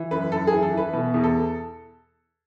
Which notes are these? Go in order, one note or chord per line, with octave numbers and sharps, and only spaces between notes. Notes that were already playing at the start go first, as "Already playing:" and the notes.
Already playing: E3
F#2 B4
F#2 A4
G#4
E3
A4
E3 B4
B2 B4
E2
A4